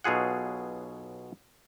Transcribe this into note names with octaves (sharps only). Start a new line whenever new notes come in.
B1 B2 F#3 F4 G#4 F#5